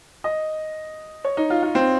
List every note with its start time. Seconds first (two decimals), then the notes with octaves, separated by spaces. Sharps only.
0.24 D#5
1.25 C#5
1.37 D#4
1.50 F4
1.63 F4
1.75 C4